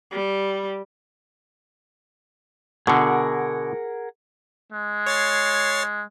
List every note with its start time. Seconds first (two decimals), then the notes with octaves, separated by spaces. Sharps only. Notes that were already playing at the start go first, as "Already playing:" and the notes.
0.11 G3
2.87 B2 D3 G#4 A#4 F#5
4.73 G#3
5.07 C#5 A6 C7